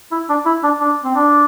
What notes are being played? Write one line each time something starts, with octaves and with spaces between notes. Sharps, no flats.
E4
D4
E4
D4
D4
C4
D4